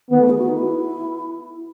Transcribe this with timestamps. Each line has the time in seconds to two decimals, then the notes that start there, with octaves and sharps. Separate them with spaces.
0.10 D#3 B3
0.20 A3
0.30 G#4
0.38 F#4
0.48 D#4
0.58 E4